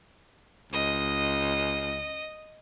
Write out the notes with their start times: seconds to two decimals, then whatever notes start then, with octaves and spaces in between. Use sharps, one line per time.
0.73 C#2 D#5